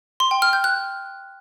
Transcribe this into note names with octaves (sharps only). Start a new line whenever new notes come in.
C6
G5
F6
G6
F#6